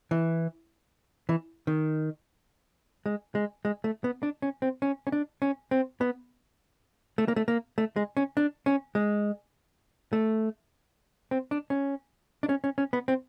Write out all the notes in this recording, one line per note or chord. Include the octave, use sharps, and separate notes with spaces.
E3
E3
D#3
G#3
G#3
G#3
A3
B3
D4
C#4
C4
C#4
C#4
D4
C#4
C4
B3
A3
A#3
A3
A#3
A3
G#3
C#4
D4
C#4
G#3
A3
C4
D4
C#4
D4
C#4
C#4
C#4
B3
C4